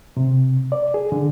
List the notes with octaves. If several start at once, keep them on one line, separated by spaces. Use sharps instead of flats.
C3
D5
G#4
D3